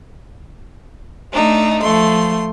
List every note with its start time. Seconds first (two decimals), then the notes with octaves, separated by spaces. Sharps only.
1.32 A3 D4 D#4
1.81 F3 A3 C6